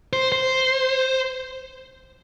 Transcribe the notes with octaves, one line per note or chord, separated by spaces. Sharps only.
C5
C5